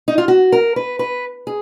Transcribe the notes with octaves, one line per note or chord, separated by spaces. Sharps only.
D#4
F4
F#4
A#4
B4
B4
G#4